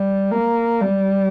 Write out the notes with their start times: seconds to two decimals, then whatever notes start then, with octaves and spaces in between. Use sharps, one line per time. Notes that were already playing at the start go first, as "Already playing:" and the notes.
Already playing: G3
0.31 A#3
0.80 G3